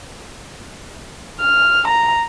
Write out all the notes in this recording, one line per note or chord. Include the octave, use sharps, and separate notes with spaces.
F6
A#5